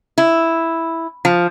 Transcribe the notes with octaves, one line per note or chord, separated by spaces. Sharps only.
E4
F3